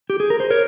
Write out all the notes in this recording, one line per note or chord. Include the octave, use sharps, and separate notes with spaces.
G4
G#4
A#4
C5
A#4 C#5